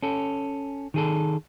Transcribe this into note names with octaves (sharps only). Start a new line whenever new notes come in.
C#4 A4
D#3 G#4 A4